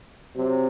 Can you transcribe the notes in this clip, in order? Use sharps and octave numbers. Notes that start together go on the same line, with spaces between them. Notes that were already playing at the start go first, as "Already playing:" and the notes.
C3 F#3